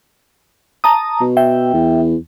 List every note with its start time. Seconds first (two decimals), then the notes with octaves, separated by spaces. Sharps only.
0.84 A5 A#5 D#6
1.21 B2
1.37 E5 G5
1.74 E2